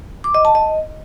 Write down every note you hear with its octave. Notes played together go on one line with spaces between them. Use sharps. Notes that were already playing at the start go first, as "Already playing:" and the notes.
D6
D#5
A5
D#5